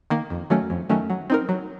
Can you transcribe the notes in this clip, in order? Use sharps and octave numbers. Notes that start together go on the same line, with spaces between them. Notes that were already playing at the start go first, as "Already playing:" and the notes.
D#3 A#3
F2
D#3 F#3 A3 C#4
F2
D#3 F#3 A3 C#4
F#3
C4 D#4 A#4
F#3